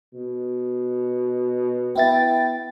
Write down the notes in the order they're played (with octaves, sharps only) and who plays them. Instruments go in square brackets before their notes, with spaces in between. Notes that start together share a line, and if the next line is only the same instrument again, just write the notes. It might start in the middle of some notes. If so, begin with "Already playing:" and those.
[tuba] B2
[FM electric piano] B3 E4 A6 [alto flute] G5